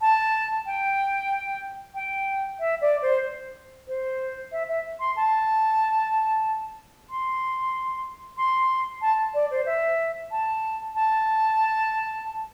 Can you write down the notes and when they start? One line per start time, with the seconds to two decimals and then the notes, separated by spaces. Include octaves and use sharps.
0.01 A5
0.66 G5
1.95 G5
2.60 E5
2.81 D5
3.02 C5
3.88 C5
4.52 E5
4.69 E5
5.00 C6
5.16 A5
7.10 C6
8.37 C6
9.02 A5
9.34 D5
9.51 C5
9.66 E5
10.31 A5
10.95 A5